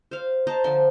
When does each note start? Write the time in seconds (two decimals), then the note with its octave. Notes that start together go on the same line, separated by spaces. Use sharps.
0.11 C5 F5
0.47 C5 D#5 A5 A#5
0.64 D3 F3 F4 C6